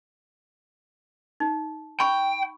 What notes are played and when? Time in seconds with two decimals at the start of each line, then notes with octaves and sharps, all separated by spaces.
1.40 D#4
2.00 G5 B5 C#6